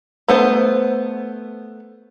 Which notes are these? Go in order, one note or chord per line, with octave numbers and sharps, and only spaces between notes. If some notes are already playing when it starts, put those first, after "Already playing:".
A3 B3 C5